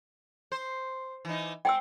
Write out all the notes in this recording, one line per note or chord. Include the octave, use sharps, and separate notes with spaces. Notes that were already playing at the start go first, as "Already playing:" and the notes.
C5
E3 D#4
C4 G5 G#5 E6